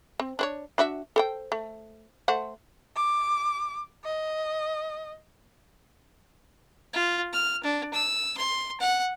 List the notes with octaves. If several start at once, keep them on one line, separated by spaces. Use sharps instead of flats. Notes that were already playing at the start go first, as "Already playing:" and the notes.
C4
D4 C5 C#5
D4 F#4 E5
A4 C5 G5
A3
A3 C5 F#5
D6
D#5
F4
F6
D4
E6
C6
F#5